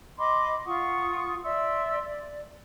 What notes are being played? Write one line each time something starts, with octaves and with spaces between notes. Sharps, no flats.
D#5 B5 C6 D6
F4 F#5 C#6 D#6
D5 E5 C6 E6
D5